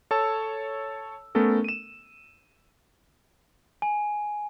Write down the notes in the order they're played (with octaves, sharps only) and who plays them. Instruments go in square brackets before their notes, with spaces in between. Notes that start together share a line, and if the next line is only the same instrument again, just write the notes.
[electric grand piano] A4 C#5 A5 E6
A3 B3 C#4 A4 A#4
D#7 E7
[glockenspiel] G#5